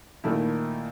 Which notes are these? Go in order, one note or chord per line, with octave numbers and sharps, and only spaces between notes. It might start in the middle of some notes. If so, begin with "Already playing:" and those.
A#2 D#3 A3 E4